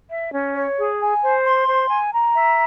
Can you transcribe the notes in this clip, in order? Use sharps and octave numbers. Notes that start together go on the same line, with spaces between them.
E5
C#4
C#5
G#4
G#5
C5
C6
C5
G#5
A#5
E5